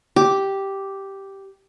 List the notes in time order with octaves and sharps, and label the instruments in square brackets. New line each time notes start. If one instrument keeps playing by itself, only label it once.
[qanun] G4 D6